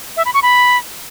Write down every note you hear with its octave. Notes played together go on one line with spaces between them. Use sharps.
E5
B5
C#6
B5